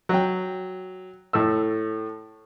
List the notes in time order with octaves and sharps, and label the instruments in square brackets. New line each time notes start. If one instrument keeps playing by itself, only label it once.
[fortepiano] F#3 G5
A2 A3 E6